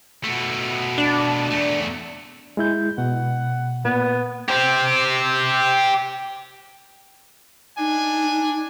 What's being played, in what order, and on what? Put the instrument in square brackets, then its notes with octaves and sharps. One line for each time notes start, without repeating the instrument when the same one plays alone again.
[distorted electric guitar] B2 A3
[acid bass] D4
[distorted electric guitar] E2 A3
[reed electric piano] G#3 E4 G6
[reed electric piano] B2 [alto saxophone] F#5
[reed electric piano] A#2 [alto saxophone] B3
[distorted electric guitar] G4 C5
[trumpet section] D4 G#5 [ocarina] D#4